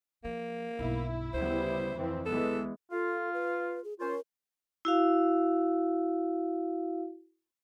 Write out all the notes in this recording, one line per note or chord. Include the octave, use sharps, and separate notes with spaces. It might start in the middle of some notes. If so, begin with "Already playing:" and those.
F3 A#3
B1 G2 E4
D2 C#3 G3 B3 C5
F2 E3 C4
E3 G#3 B3 A4
F4 A4
B4
G#4
C#4 F4 A#4 C5
E4 F#4 F5